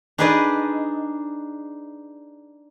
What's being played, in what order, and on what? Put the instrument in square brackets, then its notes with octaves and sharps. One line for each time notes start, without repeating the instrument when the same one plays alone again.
[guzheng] D4 D#4 G#4 B4 D5 D#5